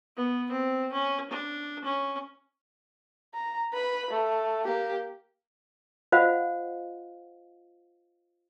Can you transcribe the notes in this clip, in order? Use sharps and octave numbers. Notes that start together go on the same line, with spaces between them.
B3
C4
C#4
D4
C#4
A#5
B4 B5
A3
A#3 G4
F4 C5 D#5 F5 F#5